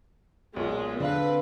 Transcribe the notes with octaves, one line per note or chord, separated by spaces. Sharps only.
B1 A#2 G#3
D3 C4 B4 F5